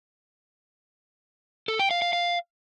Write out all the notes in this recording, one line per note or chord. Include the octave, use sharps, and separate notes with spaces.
A4
G5
F5
F5
F5